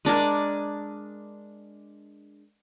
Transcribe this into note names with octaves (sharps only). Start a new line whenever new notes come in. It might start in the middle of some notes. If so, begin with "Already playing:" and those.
G#3 D4 A#4 G#5